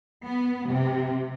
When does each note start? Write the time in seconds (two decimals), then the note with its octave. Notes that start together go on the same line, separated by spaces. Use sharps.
0.25 B3
0.68 C3